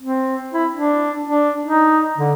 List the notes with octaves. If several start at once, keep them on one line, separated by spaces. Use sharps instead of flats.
C4
E4
D4
D4
D#4
D3